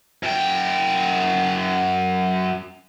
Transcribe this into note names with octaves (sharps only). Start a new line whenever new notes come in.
F#2 G5